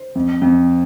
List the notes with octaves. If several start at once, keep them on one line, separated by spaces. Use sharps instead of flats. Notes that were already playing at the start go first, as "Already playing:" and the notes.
Already playing: C5
F2
F2